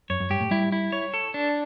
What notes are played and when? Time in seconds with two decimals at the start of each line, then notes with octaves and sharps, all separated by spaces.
0.10 F#2 C#5
0.20 F#2
0.30 G2 G4
0.41 A2
0.51 G3 E4
0.72 E4
0.92 C#5
1.14 A4
1.34 D4